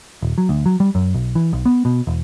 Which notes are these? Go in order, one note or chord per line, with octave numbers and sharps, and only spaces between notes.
D#1
F#3
D2
F#3
G3
F#2
B1
E3
B1
B3
B2
E1